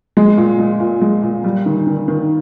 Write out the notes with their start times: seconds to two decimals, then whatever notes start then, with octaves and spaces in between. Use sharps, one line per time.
0.17 G#3
0.37 A#2
0.59 G#3
0.80 A#2
1.02 G#3
1.23 A#2
1.44 G3
1.66 D#3
1.87 D#3
2.08 D#3